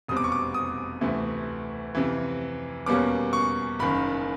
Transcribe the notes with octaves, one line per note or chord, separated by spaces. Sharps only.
F1 E2 B2 G3 C4 D#6
D6
C#6
D6
D#6
D2 C3 E3 A3
F2 C3 E3
E2 B2 G3 A#3 C#4 D6
C#6
F#1 F#2 D#3 B5